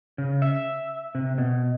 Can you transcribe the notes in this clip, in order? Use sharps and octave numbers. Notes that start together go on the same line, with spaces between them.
C#3
E5
C3
B2